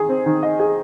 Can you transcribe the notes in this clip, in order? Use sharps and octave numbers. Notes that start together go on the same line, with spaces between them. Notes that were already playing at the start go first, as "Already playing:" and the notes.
Already playing: D#3 G#4
C4
D#3
D#5
G#4